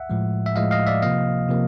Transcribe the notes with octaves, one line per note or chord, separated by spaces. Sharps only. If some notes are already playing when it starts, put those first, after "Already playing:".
Already playing: E5 F#5
A2 F3 G#3
E5
A2 F3 G#3 D#5 F5
D#5 F5
D5 E5
C3 F3 A#3 D#5 F5
C3 F3 A#3